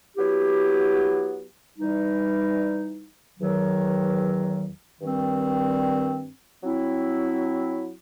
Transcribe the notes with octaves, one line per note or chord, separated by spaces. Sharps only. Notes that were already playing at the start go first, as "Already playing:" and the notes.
F#3 B3 E4 G4
E3 G3 D#4
E2 D#3 F#3
G2 D#3 G3 C4
F#3 C4 E4